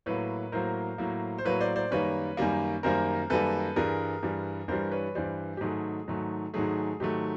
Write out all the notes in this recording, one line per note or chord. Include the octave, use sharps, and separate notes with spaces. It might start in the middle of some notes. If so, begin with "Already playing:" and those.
A2 F#3 A#3 B4 C#5
A2 F#3 A#3 A#4 C5
A2 F#3 A#3
C5
A2 F#3 A#3 B4 C#5
C5 D5
C5 D5
F#2 D#3 G3 A#3 B4 C#5
F#2 D#3 G3 A#3
F#2 D#3 G3 A#3 A#4 C5
F#2 D#3 G3 A#3 A4 B4
G2 E3 G3 G#4 A#4
G2 E3 G3
G2 E3 G3 A#4 C5
B4 C#5
G2 E3 G3 C5 D5
G4
G#2 D#3 F#3 A3 G#4
G#2 D#3 F#3 A3
G#2 D#3 F#3 A3 G#4
G#2 D#3 F#3 A3 G4